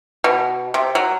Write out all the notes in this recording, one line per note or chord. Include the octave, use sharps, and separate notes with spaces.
B2
C3
F#3